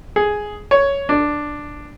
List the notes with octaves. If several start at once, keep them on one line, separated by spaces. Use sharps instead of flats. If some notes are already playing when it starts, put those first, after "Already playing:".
G#4
C#5
D4